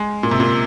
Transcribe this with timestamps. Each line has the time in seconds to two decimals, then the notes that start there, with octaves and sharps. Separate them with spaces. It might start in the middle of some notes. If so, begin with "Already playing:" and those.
Already playing: G#3
0.23 A#2
0.31 C3
0.40 A#2